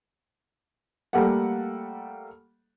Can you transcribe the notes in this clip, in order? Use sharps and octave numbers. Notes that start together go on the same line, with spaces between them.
G3 A3 A#3 G4 A4 F#5